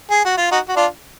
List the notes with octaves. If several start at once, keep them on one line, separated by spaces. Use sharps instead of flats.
G#4
F#4
F4
D#4 F#4
F#4
D4 F4